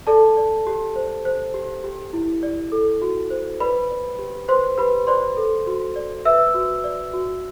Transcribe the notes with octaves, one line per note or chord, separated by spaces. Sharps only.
A4 D5 A5
D5
G4
C5
C5
G4
G4
E4
D5
A4
F#4
C5
B4 D5 B5
D5
G4
B4 C5 C6
G4 B4 B5
C5 D5 C6
A4
F#4
D5
B4 E5 E6
F#4
D5
F#4